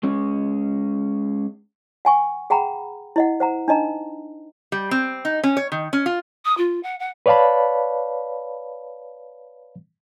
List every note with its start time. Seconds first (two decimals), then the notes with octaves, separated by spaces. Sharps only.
0.03 G#3 C#4
2.05 F#5 G#5 C#6
2.50 G#4 F#5 G5 A#5 B5
3.16 E4 D#5 F#5
3.40 C5 F#5 A#5
3.68 D4 D#4 D#5 A#5
4.72 G3
4.91 C4
5.25 D#4
5.44 C#4
5.57 C#5
5.72 D#3
5.93 C#4
6.06 F4
6.45 D#6
6.57 F4
6.83 F#5
6.99 F#5
7.26 B4 C#5 D5 F5 A5 B5